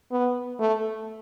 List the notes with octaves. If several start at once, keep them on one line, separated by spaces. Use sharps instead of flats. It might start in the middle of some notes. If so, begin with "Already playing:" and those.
B3
A3